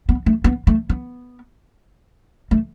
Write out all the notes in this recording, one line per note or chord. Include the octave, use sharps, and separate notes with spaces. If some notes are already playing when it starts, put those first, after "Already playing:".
B3
A3
B3
A3
B3
A3